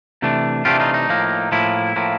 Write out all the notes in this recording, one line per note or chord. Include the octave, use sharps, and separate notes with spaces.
C3 E3 A3 D4
C3 E3 A3 D4 F4 G4
D#4 F4
D#4
A2 F3 A#3
A2 F3 A#3 E4
A2 F3 A#3